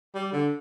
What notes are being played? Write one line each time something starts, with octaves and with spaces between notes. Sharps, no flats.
G3
D3